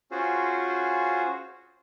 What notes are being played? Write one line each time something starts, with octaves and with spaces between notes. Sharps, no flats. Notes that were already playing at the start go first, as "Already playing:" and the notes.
C#4 F4 F#4 G#4 C5